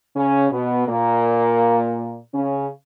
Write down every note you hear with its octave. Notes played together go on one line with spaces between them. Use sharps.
C#3 C#4
B2 B3
A#2 A#3
C#3 C#4